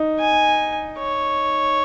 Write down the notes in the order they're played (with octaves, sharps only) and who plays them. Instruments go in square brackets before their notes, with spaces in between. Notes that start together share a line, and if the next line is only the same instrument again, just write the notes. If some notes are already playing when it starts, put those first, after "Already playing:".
Already playing: [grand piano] D#4
[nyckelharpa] G#5
C#5